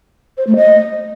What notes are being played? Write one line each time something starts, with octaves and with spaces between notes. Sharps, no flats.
C5
A3
D#5